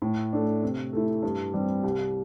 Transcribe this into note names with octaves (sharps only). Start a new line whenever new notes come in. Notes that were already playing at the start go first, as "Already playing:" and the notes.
A2
A3 D4
C3
A3 E4
G2
G3 C4
C2